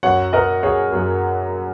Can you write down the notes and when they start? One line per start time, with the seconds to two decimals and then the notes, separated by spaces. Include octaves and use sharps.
0.03 F#2 F#3 C#5 F#5
0.33 A#4 D#5
0.63 G#4 C#5
0.92 F#2 F#3 G#4